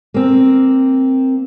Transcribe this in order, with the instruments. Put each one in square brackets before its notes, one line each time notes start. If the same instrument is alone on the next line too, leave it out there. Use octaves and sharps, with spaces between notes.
[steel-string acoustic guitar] A#3 C4